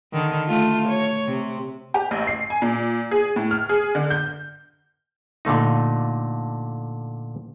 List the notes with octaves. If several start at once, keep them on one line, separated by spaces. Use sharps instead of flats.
D3 D#3
A3 F4
C#5
C3
G4
A1
C7
G#5
A#2
G#4
A2
F6
G#4
D3
G6
A#2 D3 A3 D#4